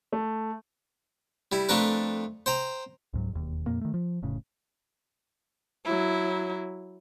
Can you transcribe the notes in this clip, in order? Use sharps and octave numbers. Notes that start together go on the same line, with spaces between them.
A3
G3 E4
F2 A3 D4 A#4 B4
C5 G5 A#5
C#2 G#2 F#3
E1 D#2
F2 A#2 A#3
D#3 A3
F3
F1 A2 C#3
F#3 E4